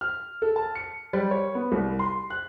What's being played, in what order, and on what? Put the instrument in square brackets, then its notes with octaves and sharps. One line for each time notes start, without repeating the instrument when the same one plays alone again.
[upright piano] F6
A4
A5
C#7
G3
C#5
B3
C2
C6
F#6